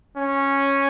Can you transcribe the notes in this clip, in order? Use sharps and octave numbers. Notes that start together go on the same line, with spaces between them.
C#4